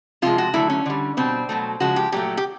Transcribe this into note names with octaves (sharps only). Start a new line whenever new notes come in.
C3 F3 G#3 F4
F#4
D3 F#3 A3 E4
C#4
D3 G3
B2 G3 C4
B2 F#3 A3
C#3 F3 G#3 F#4
G4
A#2 F#3 A3 G4
G4